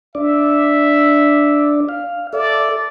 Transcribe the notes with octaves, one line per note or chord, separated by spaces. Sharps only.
D4 D5 E5
F5
A4 D5 E5